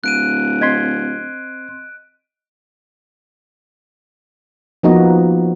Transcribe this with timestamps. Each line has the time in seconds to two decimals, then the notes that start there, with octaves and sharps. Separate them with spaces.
0.04 D1 F#6 D7 D#7
0.61 C4 D#5 C6 G#6 B6
4.83 F3 A#3 B3 D#4 F#4 D#5